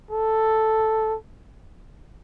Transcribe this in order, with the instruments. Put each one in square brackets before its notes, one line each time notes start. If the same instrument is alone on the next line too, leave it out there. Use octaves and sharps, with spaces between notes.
[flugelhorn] A4